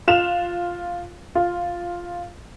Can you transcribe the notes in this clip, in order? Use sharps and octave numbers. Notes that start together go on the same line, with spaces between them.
F4 E7 F7
F4